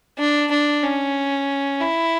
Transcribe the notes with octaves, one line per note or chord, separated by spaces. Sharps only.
D4
D4
C#4
E4